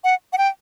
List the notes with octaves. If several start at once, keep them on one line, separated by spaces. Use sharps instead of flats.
F#5
F#5
G5